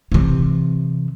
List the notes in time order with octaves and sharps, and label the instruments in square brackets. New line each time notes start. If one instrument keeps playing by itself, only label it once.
[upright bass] C3 E3